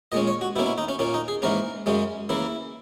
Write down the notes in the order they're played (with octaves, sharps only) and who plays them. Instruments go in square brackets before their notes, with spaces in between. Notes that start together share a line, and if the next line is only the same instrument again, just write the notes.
[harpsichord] A#2 G#3 C#4 D#5
C#5
F#4
B2 A#3 C#4 E4
E4
D#4
C#4
A#2 A#3 C#4
D#4
G#4
G#2 E3 A#3 C#4 A#4
F#2 C#3 G#3 C#4
C#3 E3 A#3 E4